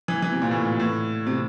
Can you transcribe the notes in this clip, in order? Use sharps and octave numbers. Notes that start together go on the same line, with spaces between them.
E3
E3
C3
A#2
A2
A#2
A2
C3